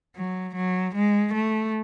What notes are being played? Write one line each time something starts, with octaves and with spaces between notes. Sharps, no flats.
F#3
F#3
G#3
A3